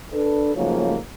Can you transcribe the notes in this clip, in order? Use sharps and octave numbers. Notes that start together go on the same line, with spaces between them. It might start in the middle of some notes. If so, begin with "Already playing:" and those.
D4 A4 B4
G#2 C#3 F3 F#3 A3 A#3